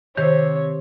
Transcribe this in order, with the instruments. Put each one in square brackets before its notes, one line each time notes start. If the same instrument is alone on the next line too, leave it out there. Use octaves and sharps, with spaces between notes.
[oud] C3 [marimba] D#3 [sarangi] C#5